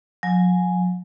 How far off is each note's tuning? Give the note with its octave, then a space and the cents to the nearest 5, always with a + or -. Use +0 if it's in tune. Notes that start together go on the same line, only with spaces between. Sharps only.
F#3 -45 G#5 +0